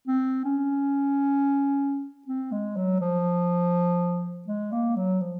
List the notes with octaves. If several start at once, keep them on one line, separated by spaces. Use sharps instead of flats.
C4
C#4
C4
G#3
F#3
F3
G#3
A#3
F#3
F3